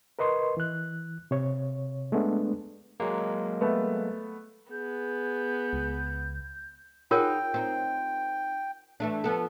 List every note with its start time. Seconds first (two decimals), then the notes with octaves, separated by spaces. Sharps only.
0.19 A#4 B4 D#5 C6 C#6
0.57 E3 F#6
1.31 C3 C#5
2.12 G#3 A3 B3 D4
3.00 F#3 G#3 A#3
3.61 A3 B3
4.72 B3 G#4 G6
5.73 C#2
7.11 D#4 F4 F#4 G#4 A#4 C#5 G5
7.54 C4 D#4
9.00 E3 A3 D4
9.24 F3 B3 A4